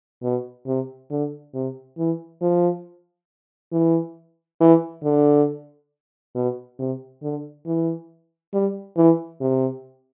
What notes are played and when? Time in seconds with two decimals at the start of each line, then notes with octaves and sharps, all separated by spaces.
0.23 B2
0.66 C3
1.10 D3
1.54 C3
1.98 E3
2.42 F3
3.72 E3
4.61 E3
5.03 D3
6.35 B2
6.79 C3
7.22 D3
7.66 E3
8.54 G3
8.97 E3
9.41 C3